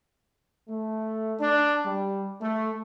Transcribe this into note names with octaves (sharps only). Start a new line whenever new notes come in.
A3
D4
G3
A3